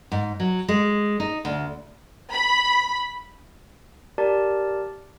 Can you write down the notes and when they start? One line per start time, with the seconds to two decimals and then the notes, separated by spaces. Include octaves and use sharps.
0.12 G#2
0.40 F#3
0.68 G#3
1.20 D#4
1.45 D2
2.32 B5
4.18 G4 A#4 D5 A5